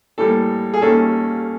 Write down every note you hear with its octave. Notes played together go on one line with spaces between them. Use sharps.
A2 E3 G3 A#3 A4
G#4
D#2 D#3 G3 A#3 C#4 A4